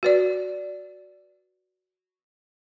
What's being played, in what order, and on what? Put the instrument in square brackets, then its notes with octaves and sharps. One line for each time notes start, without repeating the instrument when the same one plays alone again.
[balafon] F#4 B4 D5